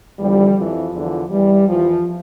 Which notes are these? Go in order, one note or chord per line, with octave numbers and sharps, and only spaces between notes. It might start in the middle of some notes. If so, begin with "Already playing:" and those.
E2 D3 F3 G3
F2 E3 F3
E2 D3 F3
E2 E3 G3
E2 E3 F3